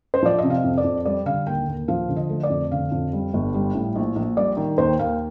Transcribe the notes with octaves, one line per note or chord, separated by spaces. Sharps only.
C5
F3 D5
C3 D#5
F5
F2
D5
F2
G3 D5
D3 F5
D#2 G5
D#2
F3 F5
D3
D#5
A3
D5
F2
D3 F5
F2
G3
G1
G3
A2
A#1
A#1
G3 D5
D#3
D#2 C5
D#2 F5